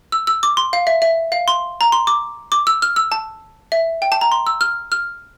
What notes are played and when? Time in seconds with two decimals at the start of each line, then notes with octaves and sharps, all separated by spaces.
0.12 E6
0.27 E6
0.43 D6
0.57 C6
0.73 F5
0.87 E5
1.02 E5
1.32 F5
1.48 C6
1.81 A#5
1.92 C6
2.07 D6
2.52 D6
2.67 E6
2.82 F6
2.96 E6
3.12 A5
3.72 E5
4.02 G5
4.12 A5
4.21 A#5
4.32 C6
4.47 E6
4.61 F6
4.92 F6